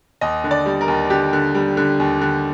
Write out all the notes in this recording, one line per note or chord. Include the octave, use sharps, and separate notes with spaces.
D#2 D#5
D3
D5
G3
A#4
D#2
D3 G4
D3
G3
D3
D#2
D3